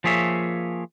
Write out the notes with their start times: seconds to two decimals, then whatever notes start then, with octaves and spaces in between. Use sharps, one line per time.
0.04 F3 A#3 G#4 C#5 E5